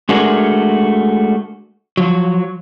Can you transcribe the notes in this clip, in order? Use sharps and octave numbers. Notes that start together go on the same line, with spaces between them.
G#3 A3 D4 F#4 G#4 A#4
F3 F#3